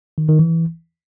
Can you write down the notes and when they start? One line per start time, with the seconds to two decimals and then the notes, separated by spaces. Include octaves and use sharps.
0.18 D#3
0.28 D#3
0.39 E3